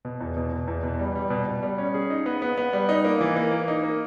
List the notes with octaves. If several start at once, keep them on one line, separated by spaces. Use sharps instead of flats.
B2
E2
B2
B2
E2
B2
G3
G3
B2
B2
G3
C#4
G#4
D#4
B3
B3
B3
G3
D#4
A#3
E3
A#3
A#3
D#4
A#3